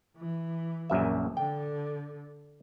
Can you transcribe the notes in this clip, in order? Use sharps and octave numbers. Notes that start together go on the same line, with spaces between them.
E3
A#1 F#2 E5
D3 G5